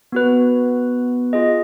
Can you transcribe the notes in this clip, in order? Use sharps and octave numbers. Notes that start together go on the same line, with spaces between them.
B3 F#4 B4
F4 G#4 D#5